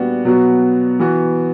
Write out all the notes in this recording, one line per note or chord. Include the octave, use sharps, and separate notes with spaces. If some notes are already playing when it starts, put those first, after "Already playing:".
Already playing: A#2 G3 B3 D4 F#4
B2 F#3 B3 F#4
E3 B3 F#4